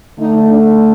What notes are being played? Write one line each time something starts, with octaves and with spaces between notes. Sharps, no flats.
D3 A3 D#4
D4